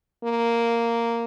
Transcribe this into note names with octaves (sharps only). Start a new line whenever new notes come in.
A#3